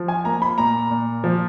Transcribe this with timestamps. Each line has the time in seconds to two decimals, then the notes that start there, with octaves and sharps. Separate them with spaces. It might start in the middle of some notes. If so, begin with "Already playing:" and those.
Already playing: F3
0.08 G#5
0.25 A#3 A#5
0.42 B5
0.58 A#2 A#5
0.91 A#2
1.24 F3